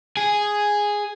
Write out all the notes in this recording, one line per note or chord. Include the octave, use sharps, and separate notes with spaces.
G#4